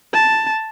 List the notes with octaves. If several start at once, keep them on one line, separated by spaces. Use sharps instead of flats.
A5